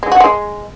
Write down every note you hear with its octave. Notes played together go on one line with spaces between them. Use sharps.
G#3
F#4
G#3